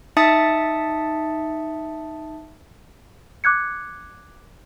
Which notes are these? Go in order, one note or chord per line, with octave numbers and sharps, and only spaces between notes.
D#4 E5 A5 D#6 A6 C#7
D6 F#6 G#6 C#7